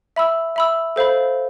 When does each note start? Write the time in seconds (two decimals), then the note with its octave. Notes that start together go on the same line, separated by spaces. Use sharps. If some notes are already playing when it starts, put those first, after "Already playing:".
0.16 E5 B5 E6
0.56 E5 B5 E6
0.96 A4 C5 F5 B5